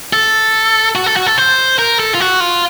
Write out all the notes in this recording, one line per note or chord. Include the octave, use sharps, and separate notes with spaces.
A4
F#4
A4
F#4
A4
C5
A#4
A4
F4
F#4
F4